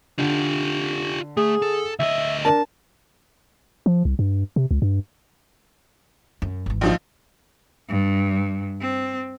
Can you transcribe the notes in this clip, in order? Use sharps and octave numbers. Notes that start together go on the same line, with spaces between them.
D3 F4 G4
A3 G#4
A4
D2 D#5 E5
D4 A#4 A5
F3
C2
G2
C3
C#2
G2
F#2
G#1 E3
A#1 F3 D#4
G2
C4